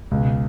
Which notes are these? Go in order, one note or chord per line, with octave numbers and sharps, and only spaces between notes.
C#2 B2